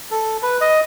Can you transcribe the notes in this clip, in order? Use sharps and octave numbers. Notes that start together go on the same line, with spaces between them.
A4
B4
D#5